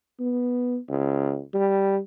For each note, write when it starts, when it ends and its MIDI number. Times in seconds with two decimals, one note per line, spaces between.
0.20 0.77 59
0.89 1.41 37
1.54 1.98 55